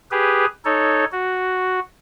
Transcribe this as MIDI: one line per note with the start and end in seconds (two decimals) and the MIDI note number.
0.11 0.46 67
0.11 0.46 68
0.11 0.46 71
0.65 1.05 63
0.65 1.05 69
0.65 1.05 73
1.12 1.80 66